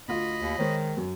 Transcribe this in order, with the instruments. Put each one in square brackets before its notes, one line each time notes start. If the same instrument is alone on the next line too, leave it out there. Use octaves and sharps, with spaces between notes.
[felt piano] D2 F4 [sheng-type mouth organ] D#5 B5
[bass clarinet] D#2
[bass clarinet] D#3 [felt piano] G#3 C5 C#5
[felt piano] F#2